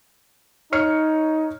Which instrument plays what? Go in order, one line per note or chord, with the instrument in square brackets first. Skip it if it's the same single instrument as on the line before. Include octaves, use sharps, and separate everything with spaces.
[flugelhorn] D#4 [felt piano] C#5 F6 C#7